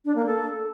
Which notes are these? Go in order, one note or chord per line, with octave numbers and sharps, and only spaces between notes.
D4
A#3
A4